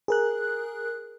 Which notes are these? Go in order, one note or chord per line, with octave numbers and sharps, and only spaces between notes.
G#4 A#4 F#6